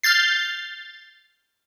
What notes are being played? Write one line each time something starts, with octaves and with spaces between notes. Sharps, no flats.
F6 G6 A6 C7